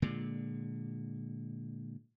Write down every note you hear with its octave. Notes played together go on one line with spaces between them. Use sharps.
A#2 D3 G#3